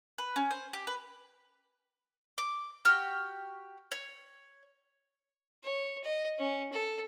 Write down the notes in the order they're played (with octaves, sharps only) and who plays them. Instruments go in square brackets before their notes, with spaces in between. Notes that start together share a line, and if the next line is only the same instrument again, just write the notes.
[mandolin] B4
C#4
C5
G4
B4
D6
F#4 G4 G5 F6
C#5
[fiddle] C#5
D#5
C#4
A4